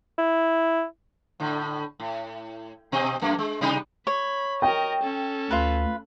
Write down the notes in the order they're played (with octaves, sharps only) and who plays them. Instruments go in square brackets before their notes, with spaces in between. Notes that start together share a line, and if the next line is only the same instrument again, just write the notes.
[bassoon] E4
[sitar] A2 D3
A2
B2 C4 D#5
F#2 A3 A#3
G#3
C3 G3 D#4
[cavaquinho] C#5 [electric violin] B5
[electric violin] A#4 D#5 [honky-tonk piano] G5
[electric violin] C#4 A4
[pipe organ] D2 [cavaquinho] F4 B4